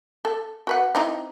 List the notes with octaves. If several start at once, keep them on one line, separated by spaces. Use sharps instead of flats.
A4
F#4 B4 F#5
C4 D#4 E4